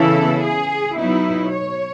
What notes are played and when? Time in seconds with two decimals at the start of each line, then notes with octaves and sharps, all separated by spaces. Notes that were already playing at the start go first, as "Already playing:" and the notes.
Already playing: C#3 E3 B3 E4 A4
0.43 G#4
0.96 B2 F#3 B3 D#4 E4
1.51 C#5